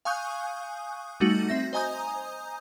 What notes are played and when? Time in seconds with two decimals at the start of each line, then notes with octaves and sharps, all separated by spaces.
0.05 F5 G#5 C#6 D#6 F#6 G6
1.20 G3 A3 D#4 F#4
1.49 C4 E5 A#6
1.73 C5 D#5 G#5 A#5 D#6 G6